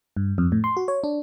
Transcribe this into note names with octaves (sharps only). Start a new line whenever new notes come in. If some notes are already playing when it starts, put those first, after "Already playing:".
G2
F2
A2
C6
F#4
C#5
D4